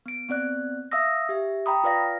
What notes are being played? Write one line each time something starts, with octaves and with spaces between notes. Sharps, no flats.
B3 D7
B3 C4 D5 F#6
E5 F5 D#6 E6 A#6
G4 E5
G5 A#5 B5 D#6
F4 B4 D5 F5 A#6